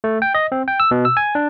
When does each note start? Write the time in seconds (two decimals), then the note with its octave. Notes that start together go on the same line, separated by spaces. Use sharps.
0.04 A3
0.22 G5
0.34 D#5
0.52 C4
0.68 G5
0.80 E6
0.91 B2
1.05 E6
1.17 G#5
1.35 D4